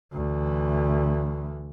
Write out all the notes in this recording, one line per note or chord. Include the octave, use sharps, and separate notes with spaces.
D2 E3